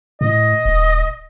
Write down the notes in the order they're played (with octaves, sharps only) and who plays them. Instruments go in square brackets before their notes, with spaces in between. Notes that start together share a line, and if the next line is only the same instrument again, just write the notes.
[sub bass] A2 [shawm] D#5
[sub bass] D#1